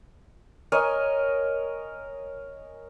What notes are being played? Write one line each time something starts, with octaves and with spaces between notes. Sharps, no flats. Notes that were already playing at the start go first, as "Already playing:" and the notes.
A#4 C#5 D#5 G#5